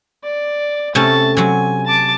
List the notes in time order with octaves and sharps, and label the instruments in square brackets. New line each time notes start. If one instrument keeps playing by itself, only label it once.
[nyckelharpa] D5
[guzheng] C3 A3 C#4 [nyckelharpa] A5
[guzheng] C3 F#3 [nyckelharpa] G#5
[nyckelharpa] A5 D6